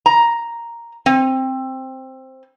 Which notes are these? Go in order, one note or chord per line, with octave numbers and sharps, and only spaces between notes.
A#5
C4